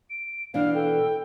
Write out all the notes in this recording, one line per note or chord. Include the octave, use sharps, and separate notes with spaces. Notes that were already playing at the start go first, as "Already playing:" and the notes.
D7
B2 E3 D4 F5
A4 G5